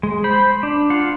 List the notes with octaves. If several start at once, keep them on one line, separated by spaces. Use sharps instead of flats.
G#3
C5 B5
D4
F4 F5 F#5